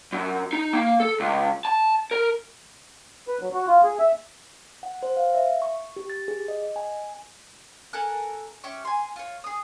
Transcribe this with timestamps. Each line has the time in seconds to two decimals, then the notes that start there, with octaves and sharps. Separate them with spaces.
0.13 F#2
0.53 D#4
0.73 A#3
1.00 A4
1.20 C#2
1.65 A5
2.11 A#4
3.28 B4
3.41 F#3
3.54 F#4
3.68 F4
3.84 G#4
3.99 E5
4.83 F#5
5.03 C5
5.17 F5
5.35 E5
5.62 C#6
5.96 G4
6.10 A6
6.28 G#4
6.48 D#5
6.62 D#5
6.76 G#5
7.93 A4 A#4 G#5 F#6
8.64 C#4 G4 E5 C#6
8.85 G#5 C6
9.16 F4 C#5
9.44 G#4 D#6